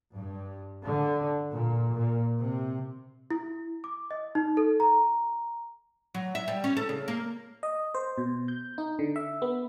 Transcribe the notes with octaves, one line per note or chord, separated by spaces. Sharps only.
G2
D3
A#2
A#2
C3
E4
D6
D#5
D#4
A4
A#5
F#3
E5
G3
C#4
A4
C#3
A#3
D#5
C5
B2
G6
D#4
D3
E5
B3